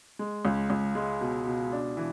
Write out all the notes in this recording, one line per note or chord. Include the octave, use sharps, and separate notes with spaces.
G#3
C#2
C#2
G#3
B2
B2
D4
E3